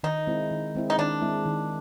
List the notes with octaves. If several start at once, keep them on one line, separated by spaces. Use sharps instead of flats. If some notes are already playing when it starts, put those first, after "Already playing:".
D#3 D#4
G#3 C4 E4
D#3
G#3 C4 E4
D#4
D#3 D4
G#3 C4 E4
D#3